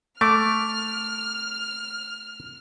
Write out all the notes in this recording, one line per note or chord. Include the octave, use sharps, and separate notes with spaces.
A3 D6 F6